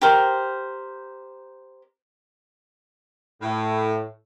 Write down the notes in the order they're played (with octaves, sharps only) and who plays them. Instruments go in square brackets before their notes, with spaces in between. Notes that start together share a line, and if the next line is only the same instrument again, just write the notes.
[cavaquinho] G4 A#4 C5
[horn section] A2